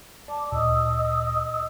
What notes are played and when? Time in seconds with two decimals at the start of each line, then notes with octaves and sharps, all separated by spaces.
0.28 D5 A5 D6
0.52 D2 A#2 D#5 D#6 E6